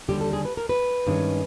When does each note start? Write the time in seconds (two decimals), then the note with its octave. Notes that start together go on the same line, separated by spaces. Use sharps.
0.08 D#2 D3 G3 G4
0.21 A4
0.33 G#4
0.45 B4
0.57 A#4
0.69 B4
1.07 G2 D#3 G#3 C#4